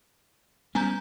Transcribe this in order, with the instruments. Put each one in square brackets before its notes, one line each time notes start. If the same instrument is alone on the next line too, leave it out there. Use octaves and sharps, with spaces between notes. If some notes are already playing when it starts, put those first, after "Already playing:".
[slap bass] G3 B3 C#4 [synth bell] G#5 A#5 G6